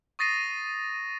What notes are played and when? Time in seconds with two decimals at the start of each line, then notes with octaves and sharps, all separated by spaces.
0.19 C#6 D#6 A6 A#6 C7 D#7